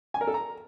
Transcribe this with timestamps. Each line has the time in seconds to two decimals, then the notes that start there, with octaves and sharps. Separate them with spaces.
0.14 G#5
0.21 A#4
0.27 A4
0.34 A#5